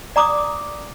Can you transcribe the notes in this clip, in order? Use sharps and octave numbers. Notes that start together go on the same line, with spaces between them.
D5 A#5 D6 D#6